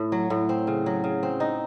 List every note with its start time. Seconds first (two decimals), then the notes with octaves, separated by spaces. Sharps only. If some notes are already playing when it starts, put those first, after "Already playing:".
Already playing: A2
0.12 F#3
0.30 A2
0.49 C4
0.67 C#3
0.86 F#3
1.04 C#3
1.23 C4
1.40 D#4